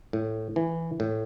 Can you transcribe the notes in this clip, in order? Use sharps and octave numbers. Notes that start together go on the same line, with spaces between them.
A2
E3
A2